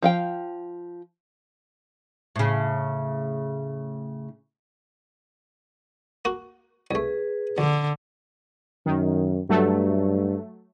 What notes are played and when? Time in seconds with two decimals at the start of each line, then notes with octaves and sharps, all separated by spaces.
0.02 F3 F5 G5
2.36 A2 C#3
6.25 A#3 F#4
6.91 C2 A3 G#4 B4
7.58 A#1 D3
8.86 F#2 D#3
9.50 G2 F#3 A3